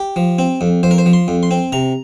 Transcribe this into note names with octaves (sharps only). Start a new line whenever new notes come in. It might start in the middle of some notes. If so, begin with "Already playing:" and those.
Already playing: G4
F3
C4
F2
F2 C5
A#4
C5
F3
C6
F2
C6
C4
C3 A#5